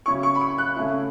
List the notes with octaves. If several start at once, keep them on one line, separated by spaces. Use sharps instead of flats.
C#3 F#3 C#4 E4 C#6
C#6
B5
C#6
F#6
C#3 A3 C#4 E4